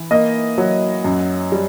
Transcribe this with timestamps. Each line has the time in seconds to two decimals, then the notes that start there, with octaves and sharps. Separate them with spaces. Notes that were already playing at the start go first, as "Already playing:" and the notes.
Already playing: E3
0.11 A#3 D#5
0.58 F#3
1.04 F#2
1.52 G3